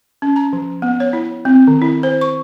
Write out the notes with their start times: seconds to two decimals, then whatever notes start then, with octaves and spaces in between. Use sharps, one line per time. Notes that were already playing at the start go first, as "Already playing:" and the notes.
0.22 C#4
0.36 A#5
0.53 F3
0.82 B3
1.00 C#5
1.13 E4
1.45 C4
1.68 D#3
1.82 E4
2.03 C5
2.21 C#6